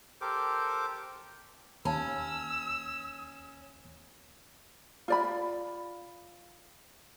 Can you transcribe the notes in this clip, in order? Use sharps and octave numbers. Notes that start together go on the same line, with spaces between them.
G4 A4 A#4 C5 D6
D#2 C#4 F5 A5 B5 E6
F4 D5 B5